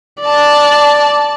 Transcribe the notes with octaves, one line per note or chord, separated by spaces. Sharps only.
D5 A5